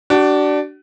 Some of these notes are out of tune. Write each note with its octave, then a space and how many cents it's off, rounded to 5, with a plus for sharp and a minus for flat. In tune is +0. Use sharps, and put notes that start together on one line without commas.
D4 +0 F#4 +40